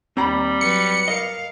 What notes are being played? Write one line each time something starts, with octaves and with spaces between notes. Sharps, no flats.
D#2 G3 C4 A#5 B5
F#3 B4 C#7
A#4 D#5 F5